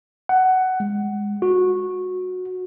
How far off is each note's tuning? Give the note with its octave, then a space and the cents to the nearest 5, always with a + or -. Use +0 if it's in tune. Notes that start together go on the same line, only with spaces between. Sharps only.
F#5 +15
G#3 -15
F#4 -15